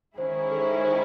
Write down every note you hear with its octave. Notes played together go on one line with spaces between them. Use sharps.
D#3 G#3 C#4 E4 G#4 C5
A4
C5
A4
C5